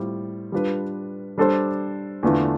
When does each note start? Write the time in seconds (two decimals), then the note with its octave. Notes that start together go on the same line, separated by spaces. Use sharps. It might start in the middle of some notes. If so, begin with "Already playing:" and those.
Already playing: A2 G3 C4 F4
0.52 G3 D4 F4 B4
1.38 G3 D4 A4 C5
2.23 E2 D3 A3 D4 F4